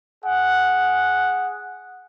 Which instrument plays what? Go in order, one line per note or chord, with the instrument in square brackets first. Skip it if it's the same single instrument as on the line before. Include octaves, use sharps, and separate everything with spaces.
[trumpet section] G#4 F#5